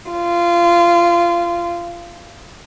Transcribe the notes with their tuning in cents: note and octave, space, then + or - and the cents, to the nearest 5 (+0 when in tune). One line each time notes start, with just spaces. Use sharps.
F4 -20